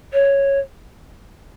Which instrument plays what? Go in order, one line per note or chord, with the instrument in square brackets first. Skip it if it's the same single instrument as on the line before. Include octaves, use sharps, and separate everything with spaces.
[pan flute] C#5